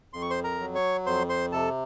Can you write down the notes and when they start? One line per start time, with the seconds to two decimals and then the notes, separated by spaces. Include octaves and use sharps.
0.13 F2 C6
0.22 C#6
0.30 C5 C6
0.44 A#4 A#5
0.60 F#3
0.75 C#5 C#6
1.06 F2 C5 C6
1.29 C5 C6
1.52 C3 A4 A5